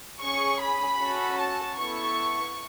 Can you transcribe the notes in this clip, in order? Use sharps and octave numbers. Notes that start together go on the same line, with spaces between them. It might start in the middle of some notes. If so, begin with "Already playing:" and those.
C#4 G#4 C#6
B5
C#4 F#4 A4
A5
B3 E4 A4 C#6